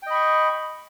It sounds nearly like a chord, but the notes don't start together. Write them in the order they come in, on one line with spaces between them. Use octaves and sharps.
G5 D#5 B5 C#6